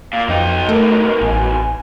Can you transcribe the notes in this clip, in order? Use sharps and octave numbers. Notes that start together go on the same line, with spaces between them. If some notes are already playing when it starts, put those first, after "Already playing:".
A#2 F5
B1 F2 D#4 G5
A3 A#4
A1 G#5